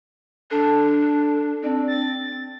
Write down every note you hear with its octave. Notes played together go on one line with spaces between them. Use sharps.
D4 A4
C4 D4
A6